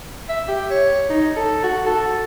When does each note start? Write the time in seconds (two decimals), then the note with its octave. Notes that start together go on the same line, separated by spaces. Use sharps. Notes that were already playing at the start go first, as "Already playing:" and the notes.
0.29 E5
0.48 G4
0.71 C#5
1.10 D#4
1.37 A4
1.64 F#4
1.87 A4